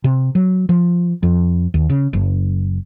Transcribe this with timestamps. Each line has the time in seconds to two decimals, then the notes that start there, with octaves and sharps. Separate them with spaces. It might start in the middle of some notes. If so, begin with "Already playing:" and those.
0.04 C3
0.35 F#3
0.69 F3
1.23 F2
1.74 D#2
1.90 C#3
2.13 F#1